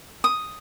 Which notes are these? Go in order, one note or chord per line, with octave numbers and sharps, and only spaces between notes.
D#6